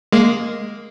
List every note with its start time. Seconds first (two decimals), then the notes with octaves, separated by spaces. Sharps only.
0.12 G#3 A#3